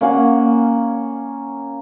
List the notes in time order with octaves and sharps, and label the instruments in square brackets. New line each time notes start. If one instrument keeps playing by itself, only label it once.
[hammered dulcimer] A#3 C#4 F5 F#5